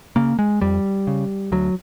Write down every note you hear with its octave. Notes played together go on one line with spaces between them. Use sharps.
C#3 A#3
G#3
F2 G3
C#3
D2 F#3